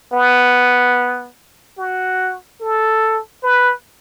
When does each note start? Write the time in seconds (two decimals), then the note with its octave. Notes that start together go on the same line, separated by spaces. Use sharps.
0.13 B3
1.78 F#4
2.60 A4
3.43 B4